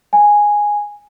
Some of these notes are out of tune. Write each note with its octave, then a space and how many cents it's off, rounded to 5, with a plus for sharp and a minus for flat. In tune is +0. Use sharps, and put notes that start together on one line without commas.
G#5 -5